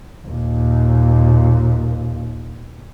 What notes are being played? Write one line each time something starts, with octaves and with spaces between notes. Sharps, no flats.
D#2 A#2